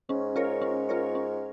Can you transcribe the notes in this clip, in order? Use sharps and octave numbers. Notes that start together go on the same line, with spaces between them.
G#2 C#4
F4 A#4 C#5
C#4
F4 A#4 C#5
C#4